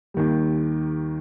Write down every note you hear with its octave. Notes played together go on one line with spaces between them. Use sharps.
D#2 D#3 G3